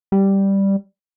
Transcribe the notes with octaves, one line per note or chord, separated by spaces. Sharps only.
G3